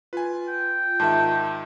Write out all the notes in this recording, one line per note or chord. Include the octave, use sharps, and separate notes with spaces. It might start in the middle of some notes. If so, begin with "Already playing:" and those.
F4 B4 G#5
G5
G#2 D#3 E5 A5